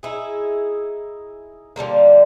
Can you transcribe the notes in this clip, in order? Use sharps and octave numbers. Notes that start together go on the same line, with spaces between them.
D#4 E4 G#4
D3 F3 G3 A#3